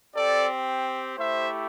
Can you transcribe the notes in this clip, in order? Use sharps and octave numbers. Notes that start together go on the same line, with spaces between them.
C4 G4 A4 D5
A3 E4 G4 C5 E5